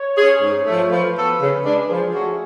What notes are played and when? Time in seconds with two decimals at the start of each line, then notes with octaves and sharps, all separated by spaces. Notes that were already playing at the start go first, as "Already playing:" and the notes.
Already playing: C#5
0.18 C#4 G#4
0.42 G#2
0.67 F3 A3
0.91 F3 B4
1.16 B3 F#4 A4
1.41 C#3
1.65 G#3 D4
1.89 F3 G#4
2.14 A3 C#4 F#4